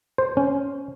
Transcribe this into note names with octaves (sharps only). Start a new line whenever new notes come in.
C5
C#4